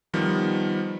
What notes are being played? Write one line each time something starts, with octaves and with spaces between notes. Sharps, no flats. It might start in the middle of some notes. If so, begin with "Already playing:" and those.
D#3 F3 G3 B3